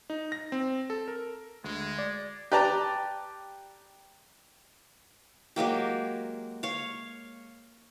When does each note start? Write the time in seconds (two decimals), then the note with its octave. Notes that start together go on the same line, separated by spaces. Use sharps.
0.10 D#4
0.32 A#6
0.52 C4
0.90 A4
1.08 A#4
1.64 D2 G#3
1.99 D5
2.52 G4 B4 D5 A5 A#5
5.56 F#3 G#3 A#3 G4
6.63 C#5 F5